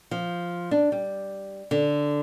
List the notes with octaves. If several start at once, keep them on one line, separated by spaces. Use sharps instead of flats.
F3
D4
G3
D3